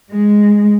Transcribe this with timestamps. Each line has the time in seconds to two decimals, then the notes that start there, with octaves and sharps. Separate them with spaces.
0.10 G#3